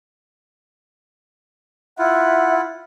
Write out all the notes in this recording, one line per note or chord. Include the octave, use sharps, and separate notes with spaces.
E4 F4 E5 F#5